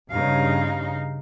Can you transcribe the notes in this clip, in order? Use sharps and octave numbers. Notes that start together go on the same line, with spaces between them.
G2 C#3 D#4 F5